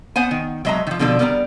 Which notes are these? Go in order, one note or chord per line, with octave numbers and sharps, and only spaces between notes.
B3 C5 F#5 G#5
D#3
F#3 G#3 D#5 E5 A5 A#5
D#3 F3
B2 D3 F3 D4 A4
G3 B3 A#4 D5 G#5 A#5